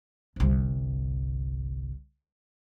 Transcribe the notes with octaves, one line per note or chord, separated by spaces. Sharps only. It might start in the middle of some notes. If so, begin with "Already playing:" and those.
G1 C2